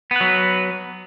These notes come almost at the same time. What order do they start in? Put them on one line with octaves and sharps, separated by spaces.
B3 B4 F#3